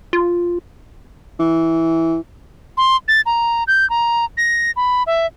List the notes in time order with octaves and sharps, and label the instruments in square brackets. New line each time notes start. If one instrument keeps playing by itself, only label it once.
[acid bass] F4
[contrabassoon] E3
[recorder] C6
A6
A#5
G6
A#5
A#6
B5
E5